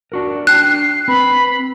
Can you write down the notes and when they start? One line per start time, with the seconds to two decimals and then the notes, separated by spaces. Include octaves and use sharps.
0.12 D4 F#4 A#4
0.47 D4 G5 A5 F#6 C7
1.08 C4 B4 B5